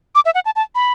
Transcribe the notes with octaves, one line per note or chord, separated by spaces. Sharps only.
D6
E5
F#5
A5
A5
B5